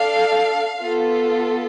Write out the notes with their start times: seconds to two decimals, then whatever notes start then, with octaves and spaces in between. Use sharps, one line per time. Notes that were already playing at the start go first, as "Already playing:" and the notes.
Already playing: D4 A4 F5
0.83 B3 F4 A4